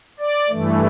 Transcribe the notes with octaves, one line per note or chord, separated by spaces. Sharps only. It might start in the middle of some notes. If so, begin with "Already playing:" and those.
D5
G2 E3 A3